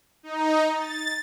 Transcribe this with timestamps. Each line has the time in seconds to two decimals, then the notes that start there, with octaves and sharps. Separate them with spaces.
0.23 D#4
0.74 A6